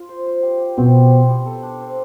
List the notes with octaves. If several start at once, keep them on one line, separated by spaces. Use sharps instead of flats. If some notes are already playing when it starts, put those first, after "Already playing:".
Already playing: F4 F5
C5
C5
G4
G4
B2 C4
G3
C5
G3
A4
D4
C5